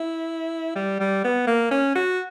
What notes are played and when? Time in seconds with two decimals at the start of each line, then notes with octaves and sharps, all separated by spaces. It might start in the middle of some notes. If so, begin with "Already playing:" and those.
Already playing: E4
0.76 G3
1.00 G3
1.24 B3
1.47 A#3
1.71 C#4
1.95 F#4